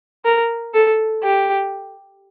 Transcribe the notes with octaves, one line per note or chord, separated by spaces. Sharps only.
A#4
A4
G4